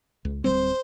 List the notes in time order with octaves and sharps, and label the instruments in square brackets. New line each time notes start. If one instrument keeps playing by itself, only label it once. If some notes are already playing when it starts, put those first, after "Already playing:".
[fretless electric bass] C#2
[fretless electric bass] D1 G3 C4 [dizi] C5